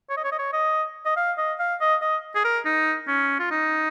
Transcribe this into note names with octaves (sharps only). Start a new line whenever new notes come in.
C#5
D#5
C#5
D#5
C#5
D#5
D#5
F5
D#5
F5
D#5
D#5
G#4
A#4
D#4
C#4
F4
D#4